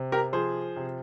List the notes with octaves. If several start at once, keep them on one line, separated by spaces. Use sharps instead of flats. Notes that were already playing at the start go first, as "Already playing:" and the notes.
Already playing: C3
G4 A#4
F3 G#4 C5
C3